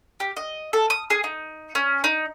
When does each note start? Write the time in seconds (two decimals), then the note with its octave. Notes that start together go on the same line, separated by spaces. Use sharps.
0.20 G4
0.37 D#5
0.73 A4
0.90 D#6
1.10 G#4
1.24 D#4
1.75 C#4
2.04 D#4